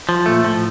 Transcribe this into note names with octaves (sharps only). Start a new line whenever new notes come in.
F3
A#2 A3
A2 F3